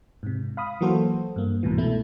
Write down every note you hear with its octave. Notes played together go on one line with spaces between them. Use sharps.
G#2 C3
F5 B5 D#6
E3 F#3 A#3 F#4 A4 C5
G2 A#3
C2 G#2 B2 E3
B2 A3 E4